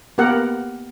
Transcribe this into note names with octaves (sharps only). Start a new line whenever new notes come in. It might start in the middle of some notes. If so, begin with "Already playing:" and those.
A#3 B3 G4 A#4 F#5